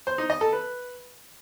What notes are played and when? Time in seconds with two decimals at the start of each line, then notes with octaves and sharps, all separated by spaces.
0.07 C5
0.18 D#4
0.30 D#5
0.41 A4
0.52 B4